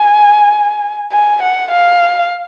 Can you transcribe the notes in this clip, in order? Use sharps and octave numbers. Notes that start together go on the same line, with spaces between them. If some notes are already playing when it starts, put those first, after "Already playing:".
Already playing: G#5
G#5
F#5
F5